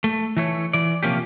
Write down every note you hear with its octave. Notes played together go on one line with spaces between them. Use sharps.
A3
E3 A3 C#5
E3 D5
C3 F3 A#3 C#4 G4